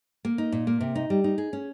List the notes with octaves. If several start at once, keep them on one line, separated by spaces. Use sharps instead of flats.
A#3
D#4
A#2
A#3
C3
D#4
G3
D#4
G#4
C#4